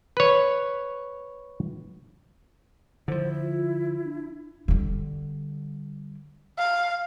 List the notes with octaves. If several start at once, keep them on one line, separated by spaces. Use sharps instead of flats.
B4 C#5
D3 F3 E4 C5
F4
D4
D3 G3
F5